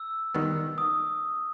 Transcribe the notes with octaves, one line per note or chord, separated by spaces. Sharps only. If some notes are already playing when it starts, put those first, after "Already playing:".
Already playing: E6
D#3 G3 B3
D#6